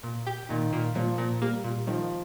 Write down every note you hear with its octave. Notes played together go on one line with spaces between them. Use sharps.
A#2
G4
A#2 D#3
A#2
A#2 F3
A#2
G3 A#3
A#2
D#3 F3